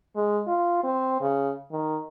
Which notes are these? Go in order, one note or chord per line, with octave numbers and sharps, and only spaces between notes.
G#3
F4
C4
C#3
D#3